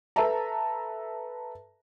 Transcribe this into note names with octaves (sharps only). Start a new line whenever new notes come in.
A4 B4 E5 A5 A#5